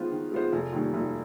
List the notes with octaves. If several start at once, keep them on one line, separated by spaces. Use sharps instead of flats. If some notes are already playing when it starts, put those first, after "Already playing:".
Already playing: D#3 G#3 B3 F4 C5
D#3
G#3 B3 F4 C5
F1
D#2 D#3 G3
F1